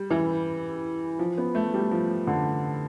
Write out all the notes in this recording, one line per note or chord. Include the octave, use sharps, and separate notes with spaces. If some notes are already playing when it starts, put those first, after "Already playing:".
Already playing: G3
E3
F3
B3
A3
G3
F3
D3